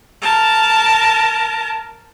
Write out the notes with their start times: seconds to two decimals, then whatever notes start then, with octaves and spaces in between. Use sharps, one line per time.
0.22 A#4 A5